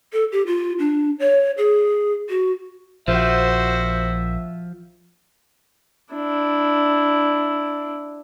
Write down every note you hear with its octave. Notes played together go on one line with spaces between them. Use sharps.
A4
G4
F4
D4
C#5
G#4
F#4
A#1 F3 F#4 C5 E5
D4 E4